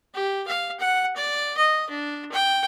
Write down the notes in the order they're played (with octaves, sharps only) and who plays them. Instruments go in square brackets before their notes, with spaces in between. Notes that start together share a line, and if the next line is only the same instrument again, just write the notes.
[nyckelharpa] G4
F5
F#5
D5
D#5
D4
G5